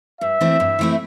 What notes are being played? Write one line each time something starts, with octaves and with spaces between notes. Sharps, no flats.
G2 E5
E3 A3 C4 E4
G2
E3 A3 C4 E4